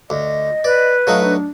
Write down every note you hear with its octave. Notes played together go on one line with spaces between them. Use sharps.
D2 D#5
B4 D5
F#3 A3 D#4 F5
D4